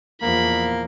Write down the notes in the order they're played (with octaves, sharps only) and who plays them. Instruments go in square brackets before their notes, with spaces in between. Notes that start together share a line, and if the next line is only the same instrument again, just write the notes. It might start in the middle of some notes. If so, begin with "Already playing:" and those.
[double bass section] E2 A#2 F3 [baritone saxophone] A#3 [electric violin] B5